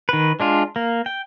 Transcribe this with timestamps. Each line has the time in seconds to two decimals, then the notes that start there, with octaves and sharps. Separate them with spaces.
0.09 D#3 B4
0.40 G#3 D4 F4
0.76 A#3
1.06 G5